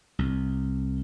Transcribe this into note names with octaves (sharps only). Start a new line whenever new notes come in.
C2